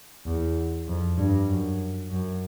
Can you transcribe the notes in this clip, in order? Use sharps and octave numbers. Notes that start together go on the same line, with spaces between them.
E2
F2
G2
F#2
F#2